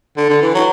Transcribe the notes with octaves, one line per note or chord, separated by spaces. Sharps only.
D3
D3
E3
F#3